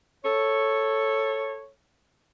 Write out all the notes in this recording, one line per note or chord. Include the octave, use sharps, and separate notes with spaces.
A4 C#5